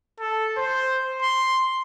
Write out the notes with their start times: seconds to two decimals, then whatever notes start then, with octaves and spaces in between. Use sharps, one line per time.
0.20 A4
0.57 C5
1.22 C6